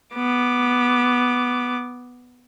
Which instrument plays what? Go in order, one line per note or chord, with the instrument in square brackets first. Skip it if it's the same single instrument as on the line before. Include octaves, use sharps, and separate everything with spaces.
[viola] B3 D6